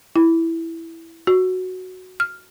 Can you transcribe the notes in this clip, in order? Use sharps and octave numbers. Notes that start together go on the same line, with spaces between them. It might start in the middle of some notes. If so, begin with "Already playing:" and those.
E4
F#4
F6